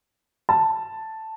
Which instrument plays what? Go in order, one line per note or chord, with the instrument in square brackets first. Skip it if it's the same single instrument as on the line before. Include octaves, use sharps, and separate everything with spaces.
[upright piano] A5